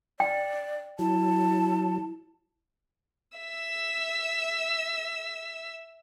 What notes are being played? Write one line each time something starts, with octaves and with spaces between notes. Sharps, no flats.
D5 G5
F#3 E4 A5
E5 E6